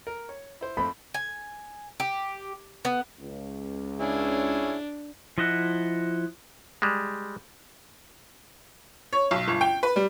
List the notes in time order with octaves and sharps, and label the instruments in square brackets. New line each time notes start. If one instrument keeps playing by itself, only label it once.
[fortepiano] A#4
C#5
E4 C5
[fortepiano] F2 A3 C5 [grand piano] B5
[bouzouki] G#5
G4
B3
[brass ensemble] C#2
[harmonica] C#4 E4 G#4 [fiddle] D4
[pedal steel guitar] F3 E4 D#5 E5 F#5
[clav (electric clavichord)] G3 G#3
[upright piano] C#5
B1
G1
G5
B4
G3